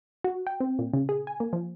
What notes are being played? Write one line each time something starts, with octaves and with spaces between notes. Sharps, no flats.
F#4
G5
C4
A#2
C#3
G#4
G#5
A#3
F3